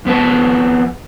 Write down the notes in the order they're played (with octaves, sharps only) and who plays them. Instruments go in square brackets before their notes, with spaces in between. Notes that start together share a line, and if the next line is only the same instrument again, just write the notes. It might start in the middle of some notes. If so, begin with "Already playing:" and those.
[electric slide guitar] F2 B3 B4 A5